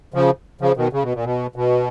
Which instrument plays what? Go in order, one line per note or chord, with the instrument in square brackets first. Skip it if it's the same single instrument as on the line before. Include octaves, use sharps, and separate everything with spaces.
[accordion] C#3 F3
C#3 F3
B2 D#3
C#3
B2
A#2
B2
B2